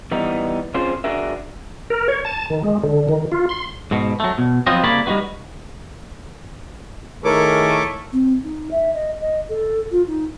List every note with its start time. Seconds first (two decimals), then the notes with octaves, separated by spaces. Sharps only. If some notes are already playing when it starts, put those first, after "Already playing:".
0.12 E3 G3 B3 D#4
0.74 C4 C#4 F4 G#4 C5
1.04 D4 F#4 G#4 A#4 E5
1.90 A#4
2.08 C#5
2.25 A5
2.50 D#3
2.64 G#3
2.83 D3
3.09 D#3
3.32 F4
3.49 C6
3.91 G#2 B2
4.20 F#3 A3
4.38 B2
4.67 F3 F#3 B3 C4 F4 D#5
4.83 C2 C#3 A#3 C#5 D5 B5
5.06 G3 D#4 F4 F#4 B4
7.25 D#3 A3 E4 G#4 A#4 C#5 D6
8.12 C4
8.44 D#4
8.71 E5
8.94 D#5
9.21 D#5
9.49 A4
9.91 F4
10.07 D#4